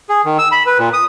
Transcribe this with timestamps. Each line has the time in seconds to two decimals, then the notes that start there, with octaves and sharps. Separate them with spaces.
0.09 G#4
0.25 D#3
0.39 E6
0.52 B5
0.66 B4
0.79 A#2
0.93 D#6